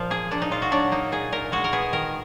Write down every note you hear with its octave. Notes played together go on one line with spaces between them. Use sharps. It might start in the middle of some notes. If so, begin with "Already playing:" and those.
Already playing: A#2 F3 F4
A#3 G#4
A#2 D4
D#4
A#2 F4
F#4
F#3 D4
A#3 D#4
A#2 G#4
A#2 A#4
G#3 F#4
A#4
B3 G#4
D#3 A#4